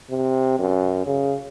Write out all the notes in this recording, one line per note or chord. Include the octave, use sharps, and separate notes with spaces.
C3
F#2
C#3